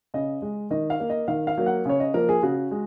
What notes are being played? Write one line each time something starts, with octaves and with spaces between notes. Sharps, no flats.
C#3 D#5
G#3
D#3 D#5
F5
A#3
D#5
D#3 F5
F5
F#3 A#3
F#5
C#3 C#5
D#5
F3 A#3 A#4
G#4
C#3 F#4
G#3